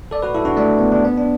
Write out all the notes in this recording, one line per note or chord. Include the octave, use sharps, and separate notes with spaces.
A4 D5
F#4 B4
E4 A4
D4 F#4
A3 D4
B3
D4
B3
D4